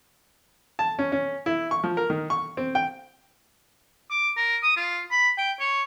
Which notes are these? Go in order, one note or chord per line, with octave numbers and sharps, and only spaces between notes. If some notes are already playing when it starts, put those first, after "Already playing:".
A5
C#4
C#4
E4
C#6
F3
A#4
D#3
C#6
C4
G5
D6
A#4
D#6
F4
B5
G5
C#5